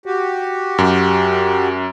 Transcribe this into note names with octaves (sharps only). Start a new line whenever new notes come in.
F#4 G4
F#2